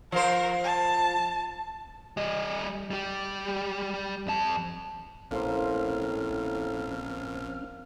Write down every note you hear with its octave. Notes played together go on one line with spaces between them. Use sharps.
F3 A#4 C5
A5
G3 D#5
G3 G4
F2 A5
A#1 A2 A#3 C4 C#4 C5 F6